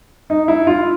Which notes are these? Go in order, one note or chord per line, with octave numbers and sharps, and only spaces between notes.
D#4
E4
F4